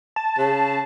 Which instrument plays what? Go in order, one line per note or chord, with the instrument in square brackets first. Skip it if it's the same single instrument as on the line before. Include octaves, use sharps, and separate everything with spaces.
[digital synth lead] A5
[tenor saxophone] C#3